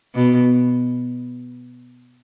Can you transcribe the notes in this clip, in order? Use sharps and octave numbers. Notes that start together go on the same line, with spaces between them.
B2